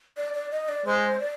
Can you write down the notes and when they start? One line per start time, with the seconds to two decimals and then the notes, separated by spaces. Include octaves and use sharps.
0.17 D5
0.34 D5
0.51 D#5
0.69 D5
0.85 G#3 C5
1.20 D5